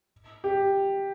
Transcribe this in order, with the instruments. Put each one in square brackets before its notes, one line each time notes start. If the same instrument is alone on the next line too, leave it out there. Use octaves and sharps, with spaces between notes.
[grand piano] G4